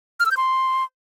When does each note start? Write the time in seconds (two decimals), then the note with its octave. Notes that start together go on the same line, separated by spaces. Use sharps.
0.20 F6
0.26 E6
0.31 G6
0.37 C6